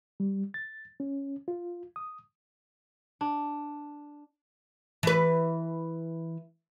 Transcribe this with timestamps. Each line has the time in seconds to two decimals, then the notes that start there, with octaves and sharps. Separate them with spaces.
0.20 G3
0.54 A6
1.00 C#4
1.48 F4
1.96 D#6
3.21 D4
5.03 E3 B4